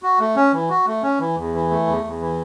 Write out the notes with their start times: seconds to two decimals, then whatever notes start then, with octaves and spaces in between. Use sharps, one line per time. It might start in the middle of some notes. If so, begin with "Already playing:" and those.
0.03 F#4
0.19 A3
0.36 C#4
0.53 E3
0.69 F#4
0.87 A3
1.03 C#4
1.20 E3
1.37 E2
1.54 E3
1.70 A3
1.87 E2
2.04 E2
2.21 E3